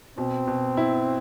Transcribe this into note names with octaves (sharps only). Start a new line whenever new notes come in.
B2 C4
B2
E4